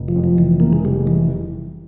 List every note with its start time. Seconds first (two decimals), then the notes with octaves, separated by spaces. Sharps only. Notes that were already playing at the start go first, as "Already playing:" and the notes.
Already playing: F1
0.08 F3
0.16 F2
0.24 F3
0.38 F1 E3
0.60 C#3 A#3
0.73 G#3
0.85 F1 G3
1.07 E3